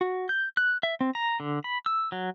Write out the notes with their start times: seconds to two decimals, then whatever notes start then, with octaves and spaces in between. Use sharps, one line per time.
0.01 F#4
0.29 G6
0.57 F#6
0.83 E5
1.01 C4
1.15 A#5
1.40 D3
1.64 B5
1.86 E6
2.12 F#3